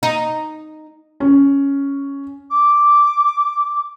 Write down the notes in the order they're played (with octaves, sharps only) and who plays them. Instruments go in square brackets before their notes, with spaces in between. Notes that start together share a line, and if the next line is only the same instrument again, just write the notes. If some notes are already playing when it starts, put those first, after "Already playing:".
[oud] D#4
[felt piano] C#4
[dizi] D6